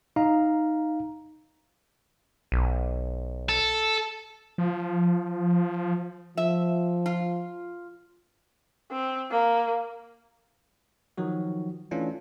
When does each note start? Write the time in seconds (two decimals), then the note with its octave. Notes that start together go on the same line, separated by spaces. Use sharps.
0.16 D#4 F5 A#5
2.52 B1
3.49 A4
4.58 F3
6.37 F3 E5
7.06 F4
8.91 C4
9.31 A#3
11.18 D#3 F3 F#3 F#4
11.91 E3 A3 C#4 D4 F4